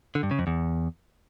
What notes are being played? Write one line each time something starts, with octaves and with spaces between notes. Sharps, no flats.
D3
G2
C#3
F2
E2